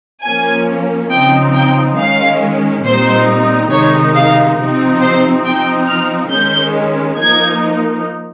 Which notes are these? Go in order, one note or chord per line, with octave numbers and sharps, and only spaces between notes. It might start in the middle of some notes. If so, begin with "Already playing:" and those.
F3 A#3 C#4 G#5
C#3 F3 C4 D#4 G5
G5
D#3 G#3 C#4 F5
A#2 G3 C4 D#4 C5
C3 D#3 G#3 D#4 C#5
F5
C3 F3 C4 D#4
C5
F3 C4 D#4 G5
F6
D#3 G#3 C#4 G6
F3 A#3 D#4 G#6